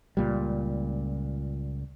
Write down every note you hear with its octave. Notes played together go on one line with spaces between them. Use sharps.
C#2 A#2 G3